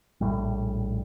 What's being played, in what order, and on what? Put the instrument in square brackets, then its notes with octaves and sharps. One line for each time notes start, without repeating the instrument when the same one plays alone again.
[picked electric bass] A#1 A2 G3